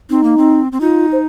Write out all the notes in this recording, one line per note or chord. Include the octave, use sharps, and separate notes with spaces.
C4 D#4
A#3
C4
C4
D#4 F4
C5